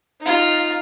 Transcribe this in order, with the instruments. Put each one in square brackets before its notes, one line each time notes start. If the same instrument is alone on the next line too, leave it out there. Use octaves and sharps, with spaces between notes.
[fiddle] D#4 F4